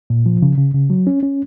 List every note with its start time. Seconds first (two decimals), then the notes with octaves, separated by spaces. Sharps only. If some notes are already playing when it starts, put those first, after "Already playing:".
0.10 A#2
0.26 F3
0.42 C#3
0.58 C#3
0.74 C#3
0.90 F#3
1.07 C#4
1.23 C#4